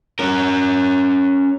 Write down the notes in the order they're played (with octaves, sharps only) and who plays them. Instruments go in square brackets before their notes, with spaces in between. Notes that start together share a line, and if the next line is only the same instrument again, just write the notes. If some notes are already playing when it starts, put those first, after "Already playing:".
[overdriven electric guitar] C#4 A#4